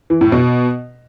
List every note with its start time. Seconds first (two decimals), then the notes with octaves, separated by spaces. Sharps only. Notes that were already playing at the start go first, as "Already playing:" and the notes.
0.10 E3
0.21 A2
0.32 B2